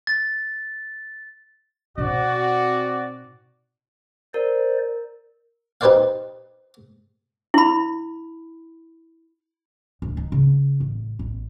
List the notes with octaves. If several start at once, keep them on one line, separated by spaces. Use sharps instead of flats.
A6
B2 C4 D#4 F#4 D5
A#4 C5 D5
D#4 G4 B4 C5 D5 F5
E4 B5
D2
D#4
C#3
A1
A1